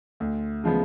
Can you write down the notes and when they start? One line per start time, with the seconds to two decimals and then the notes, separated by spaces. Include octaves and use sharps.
0.20 D2
0.64 C#3 F3 G#3 B3